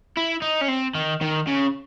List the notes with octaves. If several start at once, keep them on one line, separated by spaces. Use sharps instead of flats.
E4
D#4
C#4
C4
D#3
D#3
C#3